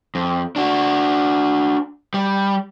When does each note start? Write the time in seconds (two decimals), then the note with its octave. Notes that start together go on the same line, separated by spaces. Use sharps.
0.15 F2
0.56 D4 F#4
2.14 G3